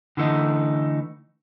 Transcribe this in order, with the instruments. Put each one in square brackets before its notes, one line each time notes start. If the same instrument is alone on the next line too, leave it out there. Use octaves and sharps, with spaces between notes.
[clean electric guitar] D3 E3 A3 D#4